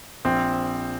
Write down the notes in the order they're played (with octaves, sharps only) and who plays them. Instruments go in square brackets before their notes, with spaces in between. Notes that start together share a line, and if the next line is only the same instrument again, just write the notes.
[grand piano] A#1 C4